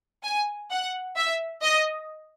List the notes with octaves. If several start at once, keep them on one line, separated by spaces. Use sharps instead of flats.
G#5
F#5
E5
D#5